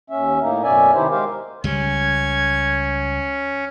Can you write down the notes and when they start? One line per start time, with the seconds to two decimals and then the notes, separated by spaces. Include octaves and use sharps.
0.10 D#2 C#4 E5
0.42 A2 A#3 D#4
0.63 F#2 B2 C#4 D5 E5 G#5
0.94 C3 D#3 D#4 E4 G4 C5
1.11 G#3 G4 A#4 C5 F5
1.64 C#2 G3 C#4 G#6